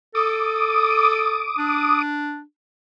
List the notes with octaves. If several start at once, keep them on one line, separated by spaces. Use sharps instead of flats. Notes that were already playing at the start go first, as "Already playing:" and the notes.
A4 D6 D#6
D4